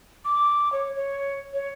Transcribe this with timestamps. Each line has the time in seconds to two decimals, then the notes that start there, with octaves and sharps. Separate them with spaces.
0.25 D6
0.72 C#5
0.96 C#5
1.54 C#5